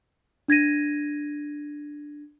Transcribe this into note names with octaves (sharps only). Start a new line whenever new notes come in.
D4 G#6 A#6 D#7